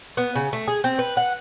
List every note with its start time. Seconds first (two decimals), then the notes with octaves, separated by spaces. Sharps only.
0.17 B3
0.35 C#3
0.53 A3
0.68 G#4
0.84 C4
0.99 B4
1.17 F#5